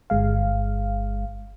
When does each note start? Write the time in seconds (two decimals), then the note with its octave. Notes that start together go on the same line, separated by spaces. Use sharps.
0.10 G1 G#3 F5